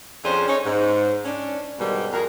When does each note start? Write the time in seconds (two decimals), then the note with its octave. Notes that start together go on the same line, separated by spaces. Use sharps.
0.24 F2 F3 C#4 D4 G#4 C5
0.48 C#4 D#4 C#5
0.65 G#2
1.25 C#4 D4
1.79 G#2 B2 D#3 G3
2.13 F2 F#4 G#4 A#4